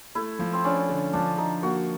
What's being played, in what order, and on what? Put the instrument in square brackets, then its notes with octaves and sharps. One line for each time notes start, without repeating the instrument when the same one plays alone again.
[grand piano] A3 [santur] E4
[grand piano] F3
[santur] C4
[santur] C#4 [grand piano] D4
[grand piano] D3
[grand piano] F3 [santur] D4
[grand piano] D3 [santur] D#4
[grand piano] A#3 [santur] F#4